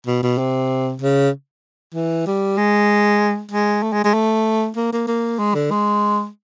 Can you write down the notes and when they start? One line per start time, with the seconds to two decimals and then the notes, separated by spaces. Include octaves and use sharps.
0.06 B2
0.23 B2
0.38 C3
1.01 C#3
1.94 E3
2.26 G3
2.58 G#3
3.51 G#3
3.83 A3
3.93 G#3
4.04 G#3
4.14 A3
4.76 A#3
4.92 A#3
5.07 A#3
5.39 G#3
5.54 D3
5.71 G#3